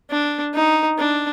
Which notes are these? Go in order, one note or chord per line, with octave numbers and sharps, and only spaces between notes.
D4
D#4
D4